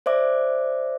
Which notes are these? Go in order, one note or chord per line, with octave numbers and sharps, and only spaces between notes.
C5 D5 E5 D6